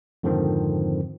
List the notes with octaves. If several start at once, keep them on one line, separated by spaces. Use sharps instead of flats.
F2 G#2 D3 D#3 F3 C4